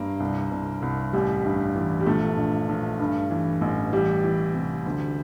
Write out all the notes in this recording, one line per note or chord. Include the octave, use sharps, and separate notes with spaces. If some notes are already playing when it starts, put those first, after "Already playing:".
Already playing: G2 A#3
C2
C2
C2
A1 G3
G2
E3
G3
A#1 A3
A#1
A#1
G2
E3
A1
E3 G3
E3
C3
D2